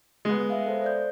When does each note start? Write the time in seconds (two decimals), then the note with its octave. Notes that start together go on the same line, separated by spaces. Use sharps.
0.25 G#3 B3
0.50 E5 F5
0.66 A4 C5
0.82 C5 D5 G6